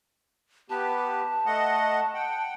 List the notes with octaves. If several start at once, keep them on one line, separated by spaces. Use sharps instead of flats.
B3 G4 B4 A5
A3 D#5 F#5
F#5 G5